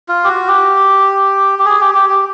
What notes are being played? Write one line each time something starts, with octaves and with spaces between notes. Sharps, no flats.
F4
G4
F#4
G4
G4
G#4
G4
G4
G4